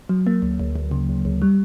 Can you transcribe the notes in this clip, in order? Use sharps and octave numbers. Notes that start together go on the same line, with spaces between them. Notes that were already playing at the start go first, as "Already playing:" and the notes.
F#3
A#3
D2
D2
D2
C#3
D2
D2
G3